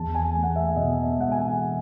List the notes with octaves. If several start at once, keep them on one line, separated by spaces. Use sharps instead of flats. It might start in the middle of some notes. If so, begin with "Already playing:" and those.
Already playing: E2 A5
G#5
A3
F#5
E5
B2 D#5
E5
E1 F#5
G#5